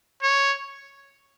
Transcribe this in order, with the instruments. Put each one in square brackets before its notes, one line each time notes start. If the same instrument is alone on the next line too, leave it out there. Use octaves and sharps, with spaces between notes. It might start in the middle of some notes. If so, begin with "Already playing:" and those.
[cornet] C#5